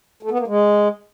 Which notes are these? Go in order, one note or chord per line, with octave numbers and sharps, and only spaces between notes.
A3
B3
A#3
G#3